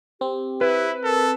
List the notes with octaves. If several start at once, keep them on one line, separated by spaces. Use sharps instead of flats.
C4 G4
E4 B4
A4 A#4